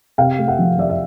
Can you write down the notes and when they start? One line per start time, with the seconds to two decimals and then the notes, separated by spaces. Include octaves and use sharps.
0.18 C3 F5 G5
0.39 A3
0.48 E5 F#5
0.59 F3
0.78 F3 D5 E5
0.89 E5